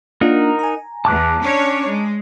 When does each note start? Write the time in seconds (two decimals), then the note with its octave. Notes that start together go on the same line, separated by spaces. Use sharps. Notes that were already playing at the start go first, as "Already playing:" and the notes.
0.21 A#3 D4 D#4 F4 A#4 F#5
0.59 G#5 A#5
1.05 E2 A5 D6 F#6
1.41 C#4 D4 C#5
1.85 G#3